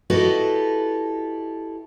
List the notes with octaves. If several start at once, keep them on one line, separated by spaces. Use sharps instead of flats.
E4 F#4 G4 A4 B4 D#5